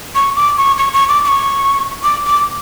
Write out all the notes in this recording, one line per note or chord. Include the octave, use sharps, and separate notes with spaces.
C#6
D6
C#6
C#6
C#6
D6
D6
C#6
D6
D6